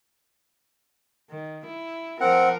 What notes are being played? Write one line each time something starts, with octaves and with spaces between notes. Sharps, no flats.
D#3
E4
F3 C4 A#4 F#5